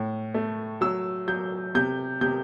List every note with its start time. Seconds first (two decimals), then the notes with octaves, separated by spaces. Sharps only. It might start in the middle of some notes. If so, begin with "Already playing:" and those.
Already playing: A2
0.34 A3
0.81 F#3 E6
1.28 F#3 G6
1.75 C3 G6
2.21 C3 G6